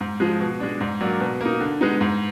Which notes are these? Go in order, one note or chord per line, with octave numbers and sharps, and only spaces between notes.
G#2
F3 G#3
B2
G#3 D4
G#2
F#3 A#3 D4
B2
A#3 D#4
D3
G#3 B3 D#4
G#2